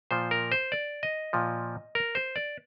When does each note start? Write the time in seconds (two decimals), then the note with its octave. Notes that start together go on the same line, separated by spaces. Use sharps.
0.11 A#2 F3 C5
0.31 A#4
0.52 C5
0.72 D5
1.03 D#5
1.33 A#2 F3
1.95 A#4
2.15 C5
2.36 D5